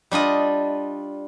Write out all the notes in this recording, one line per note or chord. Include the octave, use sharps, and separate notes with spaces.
G3 D4 F4 D#5